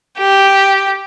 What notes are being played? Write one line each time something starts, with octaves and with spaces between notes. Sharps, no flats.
G4